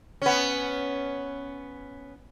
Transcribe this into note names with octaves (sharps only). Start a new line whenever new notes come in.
B3 C#4